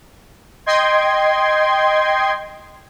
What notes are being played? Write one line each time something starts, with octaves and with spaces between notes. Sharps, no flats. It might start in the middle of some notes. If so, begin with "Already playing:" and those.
D#5 G5 C6 G#6